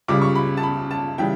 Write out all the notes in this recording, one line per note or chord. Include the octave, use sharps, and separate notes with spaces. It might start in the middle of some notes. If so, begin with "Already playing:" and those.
C#2 C#3 G3 D6
C#6
B5
A5
B5
A5
C#3 E3 G3 G5